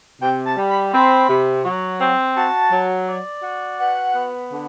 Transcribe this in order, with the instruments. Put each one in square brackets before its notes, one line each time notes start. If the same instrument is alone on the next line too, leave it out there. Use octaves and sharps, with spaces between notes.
[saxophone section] C3 [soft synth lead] G5
[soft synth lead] A5
[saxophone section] G3
[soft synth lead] B5
[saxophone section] C4 [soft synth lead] B5
[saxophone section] C3
F#3
C4
[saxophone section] F#4 [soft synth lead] A5
[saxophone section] F#3
D5
F#4
[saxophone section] B4 [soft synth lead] F#5
[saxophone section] B3
D3